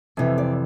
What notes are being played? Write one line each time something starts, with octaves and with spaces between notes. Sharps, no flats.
F2 C3 E3
D5